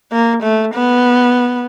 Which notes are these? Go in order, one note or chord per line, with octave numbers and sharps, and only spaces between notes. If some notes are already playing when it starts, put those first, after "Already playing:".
A#3
A3
B3